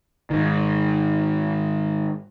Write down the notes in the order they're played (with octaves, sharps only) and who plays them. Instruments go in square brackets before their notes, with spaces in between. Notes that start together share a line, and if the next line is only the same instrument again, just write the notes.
[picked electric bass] G#2 D#3